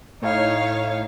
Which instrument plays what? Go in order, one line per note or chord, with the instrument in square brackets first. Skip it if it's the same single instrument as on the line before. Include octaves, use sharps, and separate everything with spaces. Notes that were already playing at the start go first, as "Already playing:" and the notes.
[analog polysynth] A2 [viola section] D#4 C#5 F5